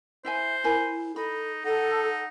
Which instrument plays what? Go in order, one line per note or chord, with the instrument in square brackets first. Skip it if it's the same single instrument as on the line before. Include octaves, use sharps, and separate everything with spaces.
[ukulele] E4 E5 G#5 [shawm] C5
[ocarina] E4 [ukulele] A#4 G#5 B5
[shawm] D#4 [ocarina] A4 [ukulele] B5
[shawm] D#4 [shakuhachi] A4 [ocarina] F#5